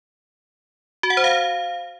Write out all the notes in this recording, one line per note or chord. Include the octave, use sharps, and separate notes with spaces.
F#4
F#5
C5
F5